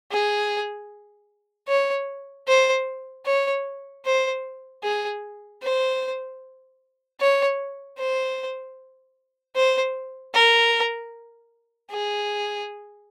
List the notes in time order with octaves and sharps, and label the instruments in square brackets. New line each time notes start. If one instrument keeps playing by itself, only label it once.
[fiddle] G#4
C#5
C5
C#5
C5
G#4
C5
C#5
C5
C5
A#4
G#4